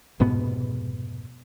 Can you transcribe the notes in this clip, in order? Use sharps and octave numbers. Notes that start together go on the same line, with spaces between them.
F1 G#2 B2 B3